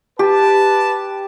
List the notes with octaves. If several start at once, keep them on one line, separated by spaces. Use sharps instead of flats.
G4 B4 A5